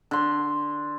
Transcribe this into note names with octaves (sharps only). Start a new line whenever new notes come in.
D3 C6